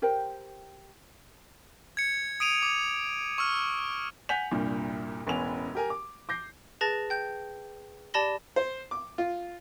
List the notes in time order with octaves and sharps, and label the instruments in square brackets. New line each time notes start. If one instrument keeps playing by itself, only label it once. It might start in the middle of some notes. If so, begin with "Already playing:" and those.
[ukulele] G4 A#4 C5 G5
[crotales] G#6 C#7
D#6 D7 D#7 F7
D6
C#6 E6 F6
[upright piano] F#5 G#5 G6 B6 F7
C2 G2 A#2
E1 A1 B3 C#4 F7
G4 A#4 G#5
D6
D6 G6 A#6 C7
[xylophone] G#4 B4 A5 A6 A#6
G5 G6
G4 D5 A5 B5 A#6 G7
[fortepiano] C5
D6
F4